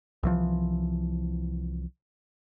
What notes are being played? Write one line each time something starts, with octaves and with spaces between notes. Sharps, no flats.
C2 E3 F3